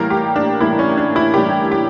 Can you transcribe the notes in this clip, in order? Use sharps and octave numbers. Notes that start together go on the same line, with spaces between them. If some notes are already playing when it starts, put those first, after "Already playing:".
Already playing: A2 E3 G3 A#3 A#4
G4
D4
A2 E3 G3 A#3 E4
C#4
D4
E4
A2 E3 G3 A#3 G4
G4